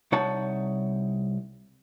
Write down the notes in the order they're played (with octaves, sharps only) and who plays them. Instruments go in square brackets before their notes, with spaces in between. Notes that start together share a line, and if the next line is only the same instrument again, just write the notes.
[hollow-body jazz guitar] C2 D#4 C#5 F#5 A5